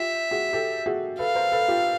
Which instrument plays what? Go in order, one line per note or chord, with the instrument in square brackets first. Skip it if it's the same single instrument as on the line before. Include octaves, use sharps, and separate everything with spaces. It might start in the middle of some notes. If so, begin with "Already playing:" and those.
Already playing: [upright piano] F4 G4 [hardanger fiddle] E5
[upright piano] F#4 G#4
G4 A4
F#4 G#4
[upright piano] A4 B4 [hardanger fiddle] F5
[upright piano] A#4 C5
A4 B4
F4 G4